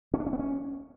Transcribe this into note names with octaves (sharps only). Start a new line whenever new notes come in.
C#4
D4
C#4
B3
C#4